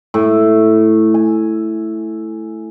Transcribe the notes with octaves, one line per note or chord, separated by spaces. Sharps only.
A2
G#5